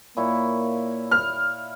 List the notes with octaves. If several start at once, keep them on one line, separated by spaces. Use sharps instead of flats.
A#2 A#3 E4 C#5
F6